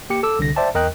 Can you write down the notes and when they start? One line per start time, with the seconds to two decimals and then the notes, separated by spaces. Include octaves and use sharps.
0.10 A#3 G4 C#7
0.23 A4 D6 E6
0.39 C2 D3 A#6
0.56 C5 D5 E5 G5 A5
0.75 E2 A#4 D#5 G5 F#6